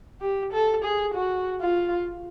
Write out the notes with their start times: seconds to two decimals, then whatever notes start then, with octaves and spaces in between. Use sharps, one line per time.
0.21 G4
0.52 A4
0.83 G#4
1.14 F#4
1.61 F4